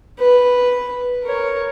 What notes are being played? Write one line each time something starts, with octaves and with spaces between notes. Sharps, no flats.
B4
A#4 C#5